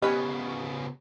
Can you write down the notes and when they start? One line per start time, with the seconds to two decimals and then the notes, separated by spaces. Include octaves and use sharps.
0.02 C#3 B3 C#4 G4 B4 C#5 D#5